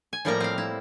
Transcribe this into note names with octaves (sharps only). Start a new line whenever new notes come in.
G#5
A2 F3 G3 A#3 A#4 A#5
C4 F5
E4